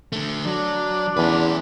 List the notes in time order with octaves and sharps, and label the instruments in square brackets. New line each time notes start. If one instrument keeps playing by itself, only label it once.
[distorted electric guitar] D3 A3
[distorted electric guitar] F#3 [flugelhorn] D4
[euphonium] E2 [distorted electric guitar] C#4 B4